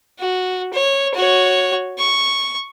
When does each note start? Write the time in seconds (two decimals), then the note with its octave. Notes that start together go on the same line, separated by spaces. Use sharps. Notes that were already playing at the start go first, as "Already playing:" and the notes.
0.20 F#4
0.73 C#5
1.14 F#4 C#5
1.99 C#6